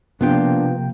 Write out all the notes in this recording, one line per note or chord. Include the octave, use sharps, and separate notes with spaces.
C3 F3 A#3 B3 D4 F4 G5